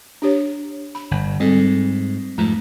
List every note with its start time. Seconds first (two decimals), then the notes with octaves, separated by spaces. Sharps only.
0.22 D4 G4 C#5
0.95 B5
1.11 G1
1.40 G#2 G3 C4 A4
2.38 F2 G#2 A3 A#5